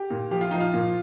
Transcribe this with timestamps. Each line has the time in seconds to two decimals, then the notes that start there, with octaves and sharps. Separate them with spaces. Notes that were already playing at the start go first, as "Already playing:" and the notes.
Already playing: G4
0.10 A#2
0.31 F3 G4
0.41 F4
0.51 F3 D#4
0.60 F4
0.74 A#2